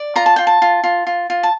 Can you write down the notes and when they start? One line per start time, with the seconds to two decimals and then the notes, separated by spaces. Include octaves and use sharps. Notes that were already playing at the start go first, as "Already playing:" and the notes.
Already playing: D5
0.16 F4 A#5
0.26 A5
0.36 F4 G5
0.47 A5
0.62 F4
0.84 F4
1.07 F4
1.30 F4
1.43 A5